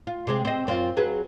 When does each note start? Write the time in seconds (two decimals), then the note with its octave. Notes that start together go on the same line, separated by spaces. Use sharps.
0.07 F4
0.27 C3 G#3 C4
0.45 C4 D#5
0.67 F#2 C4 F4
0.97 F#3 G#4 B4